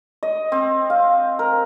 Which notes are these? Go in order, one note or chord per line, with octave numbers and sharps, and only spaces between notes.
D#5
C4
F5
A#4